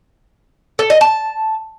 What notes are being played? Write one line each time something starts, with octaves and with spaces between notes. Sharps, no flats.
A4
D#5
A5